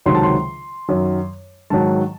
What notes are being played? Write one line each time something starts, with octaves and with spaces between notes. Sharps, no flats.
C#2 C3 D#3 F#3 C6
A5
C6
F#2 D#3 F#3
G#2 D#3 F#3 A5